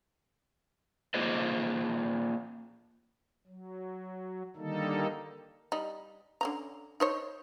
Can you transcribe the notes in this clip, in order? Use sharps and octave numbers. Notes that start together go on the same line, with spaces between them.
A#3 D#4 F4 G#4 C5 D#5
F#3
D3 D#3 G3 A#3 D#4 A4
G3 D#4
D3 C#4 A#5
D#4 C5 C#5